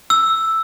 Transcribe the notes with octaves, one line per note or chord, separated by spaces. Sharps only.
E6